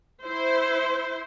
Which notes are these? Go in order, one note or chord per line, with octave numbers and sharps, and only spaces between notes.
E4 C5